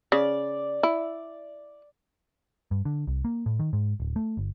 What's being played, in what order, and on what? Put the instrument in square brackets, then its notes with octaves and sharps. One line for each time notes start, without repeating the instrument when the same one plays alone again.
[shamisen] C#3 [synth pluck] D5
[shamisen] E4
[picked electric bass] G2
D3
C2
A#3
A2
D#3
G#2
D1
A3
G1